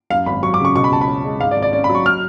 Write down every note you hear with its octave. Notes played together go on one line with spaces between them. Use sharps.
F#2 F5
G#1 B5
F#3 C#6
D6
C#3
C#6
B2 C#6
B5
C#2 A5
B5
C#4
G#3
G#2 F5
D5
G#1
D5
C#4 D5
B5
F#3
C#6
F6